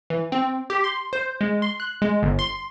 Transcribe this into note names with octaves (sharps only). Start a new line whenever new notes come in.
E3
C4
G4
C6
C5
G#3
C6
F#6
G#3
G1
C6